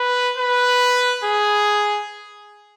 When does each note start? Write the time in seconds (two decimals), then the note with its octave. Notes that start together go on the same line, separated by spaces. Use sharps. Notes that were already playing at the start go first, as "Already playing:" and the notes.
Already playing: B4
0.37 B4
1.24 G#4